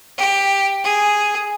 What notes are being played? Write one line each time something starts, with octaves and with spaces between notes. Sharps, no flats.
G4
G#4